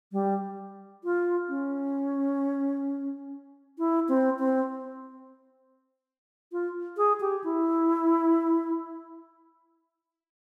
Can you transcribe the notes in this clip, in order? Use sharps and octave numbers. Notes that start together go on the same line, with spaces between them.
G3
F4
C#4
E4
C4
C4
F4
G#4
G4
E4